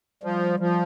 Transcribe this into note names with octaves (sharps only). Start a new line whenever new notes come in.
F3 G3
F3